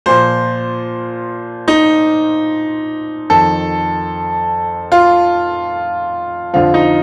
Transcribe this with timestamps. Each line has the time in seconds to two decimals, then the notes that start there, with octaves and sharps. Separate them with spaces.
0.06 A#2 F3 C5
1.68 D#4
3.30 F2 D#3 A4
4.92 F4
6.54 F2 D3 F3 F4
6.74 D#4